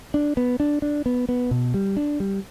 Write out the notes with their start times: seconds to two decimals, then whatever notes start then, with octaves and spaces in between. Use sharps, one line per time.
0.14 D4
0.37 B3
0.60 D4
0.82 D4
1.06 B3
1.29 B3
1.51 B2
1.74 G3
1.97 D4
2.20 G3